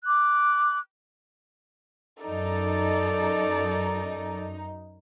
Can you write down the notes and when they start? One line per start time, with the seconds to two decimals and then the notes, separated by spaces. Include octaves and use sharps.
0.04 D6 F#6
2.23 F#2 D#4 A4 D5